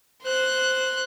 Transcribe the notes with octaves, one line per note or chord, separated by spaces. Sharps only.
C5 F#6